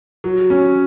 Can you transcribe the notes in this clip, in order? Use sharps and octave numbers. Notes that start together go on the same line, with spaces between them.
F#3
C#4